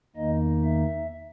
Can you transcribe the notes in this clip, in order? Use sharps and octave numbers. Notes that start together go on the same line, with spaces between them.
E2 D#3 A#3 D#4 D#5
E5